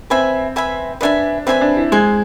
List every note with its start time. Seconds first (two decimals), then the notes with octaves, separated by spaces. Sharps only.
0.10 C4 B4 E5 G#5 B5
0.56 B4 E5 G#5 B5
1.01 D4 B4 E5 G#5 B5
1.46 C4 B4 E5 G#5 B5
1.61 D4
1.77 E4
1.92 G#3 G#4 C5 G#5